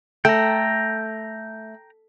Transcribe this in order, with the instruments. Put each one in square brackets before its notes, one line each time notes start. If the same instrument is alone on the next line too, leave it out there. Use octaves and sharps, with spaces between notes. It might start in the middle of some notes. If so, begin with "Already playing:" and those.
[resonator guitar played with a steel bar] A3 [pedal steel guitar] G5 A#5